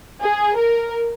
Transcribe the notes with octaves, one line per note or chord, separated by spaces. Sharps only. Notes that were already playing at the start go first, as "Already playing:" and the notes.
G#4
A#4